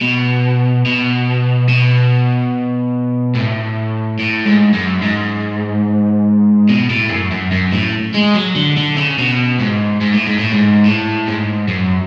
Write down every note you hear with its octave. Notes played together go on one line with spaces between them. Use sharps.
B2
B2
B2
A2
A2
G#2
F#2
G#2
B2
A2
F#2
F#2
F#2
A2
G#3
F#3
D3
D3
C#3
B2
G#2
G#2
A2
G#2
A2
G#2
A2
G#2
F#2